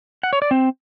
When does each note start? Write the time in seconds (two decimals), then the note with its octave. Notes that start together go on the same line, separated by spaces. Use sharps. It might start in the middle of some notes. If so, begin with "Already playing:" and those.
0.23 F#5
0.33 C#5
0.42 D5
0.51 C4